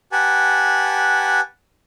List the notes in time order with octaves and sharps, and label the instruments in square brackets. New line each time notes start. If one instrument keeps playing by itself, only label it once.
[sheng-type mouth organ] G4 B4 F#5 G#5 A5